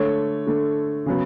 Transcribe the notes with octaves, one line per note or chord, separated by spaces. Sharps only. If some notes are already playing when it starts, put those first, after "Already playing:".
Already playing: D3 A3 C#5
D3 A3
C#3 F#3 B3